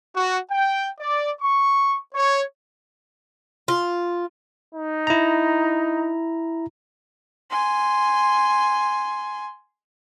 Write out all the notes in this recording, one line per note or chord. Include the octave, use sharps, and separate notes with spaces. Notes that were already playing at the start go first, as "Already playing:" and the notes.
F#4
G5
D5
C#6
C#5
F4
D#4
E4 A#5
G#5 C6